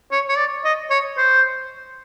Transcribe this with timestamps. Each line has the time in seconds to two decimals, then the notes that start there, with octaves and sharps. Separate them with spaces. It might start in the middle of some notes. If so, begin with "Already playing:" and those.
0.12 C#5
0.29 C#5
0.37 D5
0.64 D#5
0.90 C#5
1.18 C5